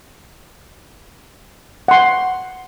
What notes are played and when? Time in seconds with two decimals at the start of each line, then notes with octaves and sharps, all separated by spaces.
1.88 F#5 C6